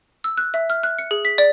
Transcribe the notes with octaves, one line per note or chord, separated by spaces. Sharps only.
E6
F#6
E5
F6
F#6
C#7
G#4
B6
D5